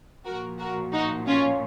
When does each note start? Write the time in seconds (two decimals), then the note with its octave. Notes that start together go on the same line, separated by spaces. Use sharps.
0.25 A#2 F3 F#4 A#4
0.59 F#4 A#4
0.93 D#4 F#4
1.27 C#4 F4